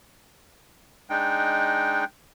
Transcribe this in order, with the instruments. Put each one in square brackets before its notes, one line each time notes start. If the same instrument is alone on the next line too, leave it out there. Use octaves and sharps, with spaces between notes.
[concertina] G#3 D4 D#4 G5